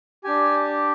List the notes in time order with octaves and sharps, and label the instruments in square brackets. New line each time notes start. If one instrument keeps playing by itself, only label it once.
[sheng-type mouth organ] D4 G4 G#5